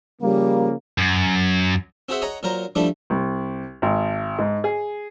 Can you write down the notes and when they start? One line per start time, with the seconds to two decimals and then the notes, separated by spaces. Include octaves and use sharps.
0.21 C#3 F3 G3 A#3
0.98 F#2
2.09 C4 F#4 G#4 C5 E5 F#5
2.22 C#5 D#5 F#5 G#5 A#5
2.43 A#2 F#3 A#4 C5 A#5
2.75 F3 G3 A3 D4 E4
3.10 C2
3.82 G#1
4.39 G#2
4.64 G#4